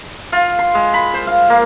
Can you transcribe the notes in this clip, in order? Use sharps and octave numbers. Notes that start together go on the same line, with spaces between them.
F4
C6
G#3
B5
C5
F5
A#3